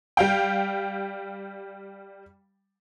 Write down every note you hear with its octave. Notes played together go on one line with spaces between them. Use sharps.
G3 F5 G5